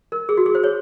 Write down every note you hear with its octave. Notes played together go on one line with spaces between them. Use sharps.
A#4
G#4
F#4
G#4
C5
C#5